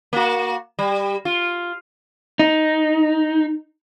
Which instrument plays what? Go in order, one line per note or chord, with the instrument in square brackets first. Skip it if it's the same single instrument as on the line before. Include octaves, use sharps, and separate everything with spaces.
[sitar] A#3 F#4
G3
F4
[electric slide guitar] D#4